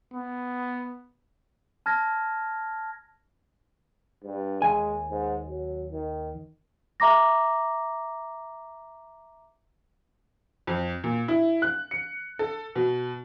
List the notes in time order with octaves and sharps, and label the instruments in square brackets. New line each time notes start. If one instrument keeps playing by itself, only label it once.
[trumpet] B3
[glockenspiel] A5 F6 G#6 A#6
[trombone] G2
[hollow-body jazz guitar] D#2 G#5 [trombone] G#3
[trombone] G#2
F#3
D#3
[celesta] E5 A#5 D6 A#6
[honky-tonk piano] F2
A#2
E4
F#6
C#7
A4
B2